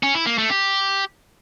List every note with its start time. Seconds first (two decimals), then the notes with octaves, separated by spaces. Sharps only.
0.03 C#4
0.15 E4
0.27 A#3
0.38 A3
0.50 G4